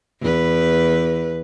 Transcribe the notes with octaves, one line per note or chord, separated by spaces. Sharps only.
E2 B4